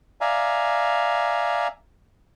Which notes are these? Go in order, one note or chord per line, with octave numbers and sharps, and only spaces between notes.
D5 E5 F5 G#5 A#5